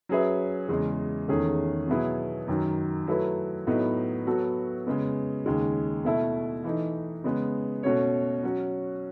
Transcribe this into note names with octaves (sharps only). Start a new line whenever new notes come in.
F#3 C#4 G#4 B4 E5
E2 C#3 G#3
E2 D#3 A3 C#4 G#4
B2 F#3 B3 E4 G#4
F#2 D#3 F#3
F#3 A3 E4 B4
A2 F#3 B3 D#4
F#3 B3 F#4 A4
C#3 G#3 B3
D#2 C#3 G#3
B2 A3 E4 A4 E5
E3 A3 D#4
C#3 G#3 B3
B2 A3 C#4 F#4 C#5
F#3 C#4 F#4